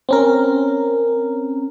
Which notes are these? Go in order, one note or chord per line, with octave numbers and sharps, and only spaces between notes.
C4 C#4 A#4